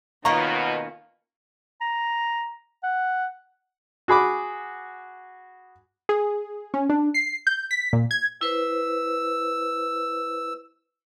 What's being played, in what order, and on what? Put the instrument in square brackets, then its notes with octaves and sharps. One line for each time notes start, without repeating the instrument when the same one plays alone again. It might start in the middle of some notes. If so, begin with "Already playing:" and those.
[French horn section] B2 [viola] D#3 F4 [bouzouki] A#3 B3 C#4 [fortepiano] A#5 C#6
[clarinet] A#5
F#5
[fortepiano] F#4 G#4 B5 D6
[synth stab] G#4
C#4
D4
C7
G6
B6
A#2
G#6
[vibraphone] E4 B4 C5 [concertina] E6